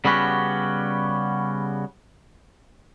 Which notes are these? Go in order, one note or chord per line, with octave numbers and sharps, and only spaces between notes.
C#3 G3 B3 C#4 F#4 G4